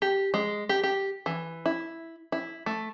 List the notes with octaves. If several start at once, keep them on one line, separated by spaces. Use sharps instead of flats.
G4
G#3
G4
G4
E3
E4
E4
A3